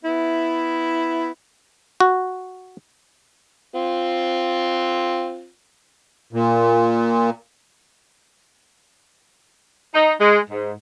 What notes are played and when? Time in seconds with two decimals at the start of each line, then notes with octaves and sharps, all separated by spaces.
0.04 B3 E4
2.00 F#4
3.74 C4 F4
6.33 A#2
9.94 D#4
10.20 G#3
10.50 G#2